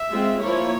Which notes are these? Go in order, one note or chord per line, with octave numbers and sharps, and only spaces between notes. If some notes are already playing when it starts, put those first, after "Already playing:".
Already playing: E5
G#3 C4 F4
F3 A#3 E4 C#5